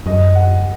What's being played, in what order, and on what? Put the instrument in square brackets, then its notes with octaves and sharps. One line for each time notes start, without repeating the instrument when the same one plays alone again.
[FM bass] F#2 [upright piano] D#5
[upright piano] F#5